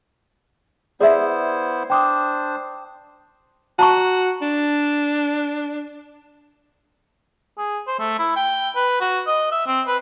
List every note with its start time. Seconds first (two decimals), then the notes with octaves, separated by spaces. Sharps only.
1.00 B3 E4 G#4 C5 D5 E5
1.90 D4 C5 G5 D6 D#6
3.79 F#4 A5 A#5 C#6
4.42 D4
7.58 G#4
7.87 C5
7.99 A3
8.19 E4
8.36 G5
8.75 B4
9.01 F#4
9.27 D#5
9.52 E5
9.67 C4
9.87 B4